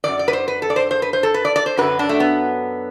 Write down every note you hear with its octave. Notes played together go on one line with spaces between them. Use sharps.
F#2 E3 D5
D5
B4
C5
B4
A4
D5
C5
C5
B4
C5
A4
B4
D5
D5
C5
F#2 D3 F#3 B4
D4
A3
B3